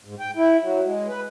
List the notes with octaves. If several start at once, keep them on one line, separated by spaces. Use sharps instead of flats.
G#2
G5
E4
F#3
G#3
B4